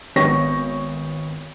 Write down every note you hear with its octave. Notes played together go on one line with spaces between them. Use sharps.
G#1 B3 C#5 G5 C#6 A#6